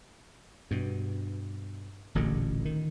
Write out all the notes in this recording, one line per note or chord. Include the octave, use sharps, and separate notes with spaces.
G2 B2
D1 A1 A#2 D3
D#3